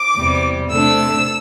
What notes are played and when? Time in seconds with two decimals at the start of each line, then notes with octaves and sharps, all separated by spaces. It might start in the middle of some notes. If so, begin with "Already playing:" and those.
Already playing: D6
0.16 E2 C3 G3
0.70 C3 A3 D4 E6